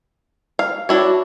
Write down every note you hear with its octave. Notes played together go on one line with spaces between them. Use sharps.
F5
D4 E4 F#4 C#5